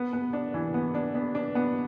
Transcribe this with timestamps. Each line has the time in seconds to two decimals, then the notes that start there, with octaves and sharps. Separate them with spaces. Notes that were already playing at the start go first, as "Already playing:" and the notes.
Already playing: B3
0.13 B3
0.33 D4
0.54 E3
0.74 B3
0.94 D4
1.15 B3
1.35 D4
1.55 B3